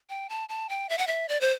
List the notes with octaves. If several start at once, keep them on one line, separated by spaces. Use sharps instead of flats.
G5
A5
A5
G5
E5
F#5
E5
D5
C5